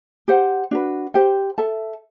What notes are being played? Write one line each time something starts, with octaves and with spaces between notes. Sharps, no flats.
G4 C5 F#5
D4 F#4 B4
G4 C5 G5
A4 E5 A5